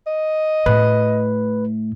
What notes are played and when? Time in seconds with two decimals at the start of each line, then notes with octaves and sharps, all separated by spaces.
0.07 D#5
0.66 A2 B4